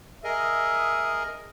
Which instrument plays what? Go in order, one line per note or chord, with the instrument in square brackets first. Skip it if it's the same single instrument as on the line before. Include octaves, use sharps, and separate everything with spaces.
[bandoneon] G#4 A#4 D#5 [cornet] E5